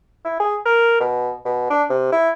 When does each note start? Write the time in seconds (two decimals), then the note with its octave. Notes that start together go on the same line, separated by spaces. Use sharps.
0.25 E4
0.40 G#4
0.66 A#4
1.00 B2
1.45 B2
1.70 D4
1.90 C3
2.12 E4